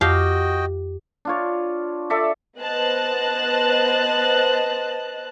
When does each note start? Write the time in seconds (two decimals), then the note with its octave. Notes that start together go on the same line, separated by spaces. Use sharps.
0.01 F2 F#4 G4 D#5 F5 G5
1.25 D4 F4 C#5
2.10 A4 D5 E5
2.59 B3 C5 D#5 A5 F#6